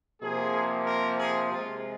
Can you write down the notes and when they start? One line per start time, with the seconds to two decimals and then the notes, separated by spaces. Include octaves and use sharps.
0.22 C3 F3 A#3 G#4
0.87 A#4
1.19 G#4
1.51 C3 G#3 F4